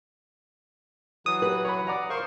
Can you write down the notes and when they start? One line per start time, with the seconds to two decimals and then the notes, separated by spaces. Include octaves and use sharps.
1.26 E3 F#3 D#6
1.42 G4 B4
1.65 C#5 B5
1.87 D5 F#5 A#5
2.10 A#4 C5 F5 C6 C#6